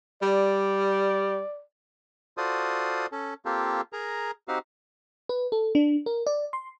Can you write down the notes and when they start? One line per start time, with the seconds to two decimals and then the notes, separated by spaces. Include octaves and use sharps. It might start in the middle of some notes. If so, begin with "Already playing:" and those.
0.22 G3 D5
2.38 F4 F#4 A4 C5 D5 D#6
3.12 C#4 A4
3.45 A#3 C4 F4 G4 A4
3.93 G#4 A#4 A#5
4.48 C4 D#4 F#4 G4 F5
5.29 B4
5.52 A4
5.75 D4
6.06 A#4
6.27 D5
6.53 C6